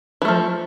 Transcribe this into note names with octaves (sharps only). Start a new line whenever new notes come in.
E3 F3 A3